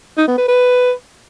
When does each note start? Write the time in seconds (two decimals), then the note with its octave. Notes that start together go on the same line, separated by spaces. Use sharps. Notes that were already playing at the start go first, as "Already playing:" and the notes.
0.17 D#4
0.27 B3
0.38 B4
0.48 B4